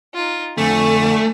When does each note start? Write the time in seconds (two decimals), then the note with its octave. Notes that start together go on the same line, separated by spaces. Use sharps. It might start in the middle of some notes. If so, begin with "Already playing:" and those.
0.14 D#4 F4
0.58 F2 D3 A3 G#5 E7